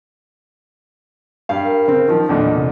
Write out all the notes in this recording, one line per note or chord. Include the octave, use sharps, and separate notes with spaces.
G2 F5
A#4
C#3 C4
D#3 F3
E2 A#2 D3 D#5
C3